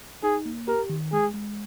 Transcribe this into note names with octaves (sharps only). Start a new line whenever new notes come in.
D#4 G#4
A#3
G4 A#4
D#3
G#3 G#4
G#3